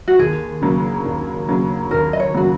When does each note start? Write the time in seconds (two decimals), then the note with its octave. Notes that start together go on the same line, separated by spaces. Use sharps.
0.08 F#4
0.19 D#2 G#4
0.62 C#3 F#3 A#3
1.05 D#2
1.48 C#3 F#3 A#3
1.91 D#2 A#4
2.13 D#5
2.20 C#5
2.34 C#3 F#3 A#3 F#4